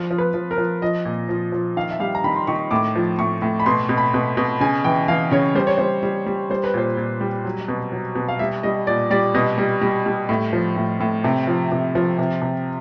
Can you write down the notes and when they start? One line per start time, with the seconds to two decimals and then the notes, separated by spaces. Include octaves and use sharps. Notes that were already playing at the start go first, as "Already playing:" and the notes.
Already playing: F3
0.11 F3
0.18 B4
0.34 F3
0.51 A#4
0.58 F3
0.82 F3 D#5
1.05 A#2
1.29 F3
1.52 F3
1.76 D#3 F5
1.91 E5
2.00 G3 F5
2.15 A#5
2.24 D#3 B5
2.36 C6
2.47 D#3 C#6
2.71 A2 D6
2.96 F3
3.19 A2 C#6
3.42 A2
3.60 B5
3.66 B2 C6
3.89 B2
3.98 B5
4.14 B2
4.37 B2
4.60 C#3 G#5
4.84 E3 G5
5.08 E3 F5
5.31 C#3 C#5
5.55 G3 C5
5.67 C#5
5.78 G3 C5
6.03 G3
6.26 G3
6.50 G3 C5
6.64 B4
6.74 A#2 C5
6.97 A#2
7.21 G3
7.45 F#3
7.68 B2
7.92 F#3
8.15 B2
8.28 F5
8.39 G3 E5
8.63 G3 D#5
8.87 A#2 D5
9.11 G3 D5
9.34 B2 D#5
9.58 G3
9.81 G3
10.06 G3
10.29 A2
10.53 F3
10.76 A2
11.00 A2
11.24 C3
11.47 F3
11.72 C3
11.95 F3
12.19 C3
12.42 C3